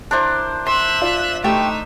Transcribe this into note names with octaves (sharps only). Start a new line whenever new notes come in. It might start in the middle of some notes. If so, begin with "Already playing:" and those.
D4 E4 A#4 C5
E5 C6 F#6
F4 D5
A3 D#4 G4 E5 G5 C#6